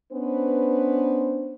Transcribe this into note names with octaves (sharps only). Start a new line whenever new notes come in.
B3 C#4 D4 B4 C5